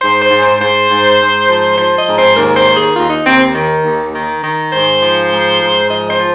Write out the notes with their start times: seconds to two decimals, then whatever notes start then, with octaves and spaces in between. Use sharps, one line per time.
0.01 G#2 C5
0.21 C5
0.31 G#2
0.41 C5
0.61 G#2 C5
0.90 G#2
1.20 G#2
1.48 F3
1.77 F3 C5
1.97 D#5
2.07 G#2
2.17 C5
2.36 D#2 A#4
2.56 C5
2.66 D#3
2.76 G#4
2.95 D#2 F4
3.10 D#4
3.25 D#2 C4
3.55 D#3
3.83 D#2
4.14 D#3
4.43 D#3
4.71 G#2 C5
5.02 F3
5.30 G#2
5.60 G#2
5.90 F3 D#5
6.10 C5
6.19 F3